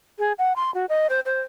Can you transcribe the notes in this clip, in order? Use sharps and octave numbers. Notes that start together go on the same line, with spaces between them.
G#4
F#5
C6
F#4
D#5
C5
C5